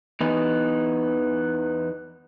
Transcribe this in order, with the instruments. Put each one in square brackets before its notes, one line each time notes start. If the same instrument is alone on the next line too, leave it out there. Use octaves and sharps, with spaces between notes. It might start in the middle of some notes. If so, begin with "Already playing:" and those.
[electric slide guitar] E2 E3 B3 D#4